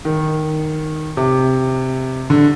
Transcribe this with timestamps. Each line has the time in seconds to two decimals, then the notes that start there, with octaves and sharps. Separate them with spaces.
0.05 D#3
1.17 C3
2.30 D3